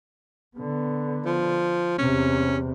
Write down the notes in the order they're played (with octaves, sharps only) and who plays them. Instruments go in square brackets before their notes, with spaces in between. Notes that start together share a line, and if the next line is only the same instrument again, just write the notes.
[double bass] D3 B3
[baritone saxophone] F3
[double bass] E2 C3 [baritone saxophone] C#4